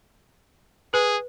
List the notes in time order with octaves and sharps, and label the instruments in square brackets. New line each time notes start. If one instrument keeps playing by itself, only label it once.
[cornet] G#4 [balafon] B4